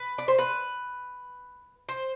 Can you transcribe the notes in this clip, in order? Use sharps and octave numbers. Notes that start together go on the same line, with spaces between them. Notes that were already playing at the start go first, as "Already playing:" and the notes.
Already playing: B4
D5
C5
B4
C5